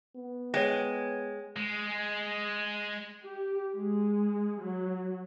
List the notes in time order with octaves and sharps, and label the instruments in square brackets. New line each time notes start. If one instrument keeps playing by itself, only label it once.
[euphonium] B3
[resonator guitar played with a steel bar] G#3 [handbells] C#5 G5 A#6
[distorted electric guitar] G#3
[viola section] G4
G#3
F#3